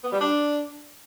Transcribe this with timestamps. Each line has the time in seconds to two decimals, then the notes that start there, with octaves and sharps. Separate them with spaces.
0.04 B3
0.12 G3
0.21 D4